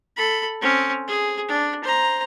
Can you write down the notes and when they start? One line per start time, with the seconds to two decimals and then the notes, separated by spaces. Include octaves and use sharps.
0.17 A4 B5
0.61 C4 C#4
1.08 G#4
1.49 D4
1.84 C5 A#5